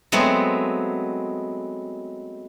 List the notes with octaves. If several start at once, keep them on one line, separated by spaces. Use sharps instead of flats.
F#3 G#3 A3 B3 C4